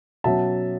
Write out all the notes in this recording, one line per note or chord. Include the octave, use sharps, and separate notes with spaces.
B2 F#3 C#4 E5 A5